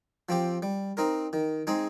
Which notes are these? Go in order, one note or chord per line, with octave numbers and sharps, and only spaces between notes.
F3 C4 G4
G3
C4 D#4 A#4
D#3
G#3 C4 D#4 G#4